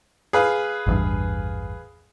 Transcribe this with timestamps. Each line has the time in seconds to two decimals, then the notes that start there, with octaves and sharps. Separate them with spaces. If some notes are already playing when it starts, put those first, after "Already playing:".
0.33 G#4 B4 F5
0.87 A1 E2 G2